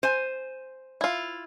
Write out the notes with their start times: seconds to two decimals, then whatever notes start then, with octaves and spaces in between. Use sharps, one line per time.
0.03 C5 G#5
1.01 E4 F4